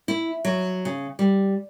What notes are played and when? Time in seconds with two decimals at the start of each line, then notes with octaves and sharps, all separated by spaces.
0.08 E4
0.45 F#3
0.85 C#3
1.19 G3